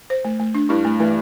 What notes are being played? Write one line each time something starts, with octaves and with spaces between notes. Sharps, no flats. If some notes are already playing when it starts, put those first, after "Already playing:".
C5
A3
A3
D4
G2 E4
A3
E3 A3